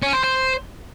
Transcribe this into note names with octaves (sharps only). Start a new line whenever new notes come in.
C#4
C5
C5